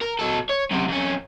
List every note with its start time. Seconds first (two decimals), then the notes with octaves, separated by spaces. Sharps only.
0.01 A#4
0.19 F#3 A4
0.50 C#5
0.71 F#2 C3
0.89 F2 C#4